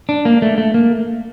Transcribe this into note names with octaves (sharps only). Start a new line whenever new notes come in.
D4
A#3
A3
A3
A#3